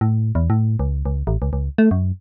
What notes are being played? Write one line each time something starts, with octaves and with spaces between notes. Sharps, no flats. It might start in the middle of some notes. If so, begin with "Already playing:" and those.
A2
E2
A2
C#2
C#2
A1
C#2
C#2
A3
F#2